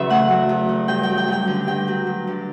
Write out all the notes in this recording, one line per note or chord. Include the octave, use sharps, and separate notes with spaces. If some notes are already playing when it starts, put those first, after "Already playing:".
Already playing: E2 C#3 F#3 B4 E5
A3 F#5
F#3
E2
C#3
G2 G5
F#3 G5
G5
G2 G5
D3
G2 G5
F#3
G2
D3